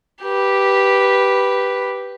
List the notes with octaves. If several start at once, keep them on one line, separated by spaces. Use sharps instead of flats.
G4 B4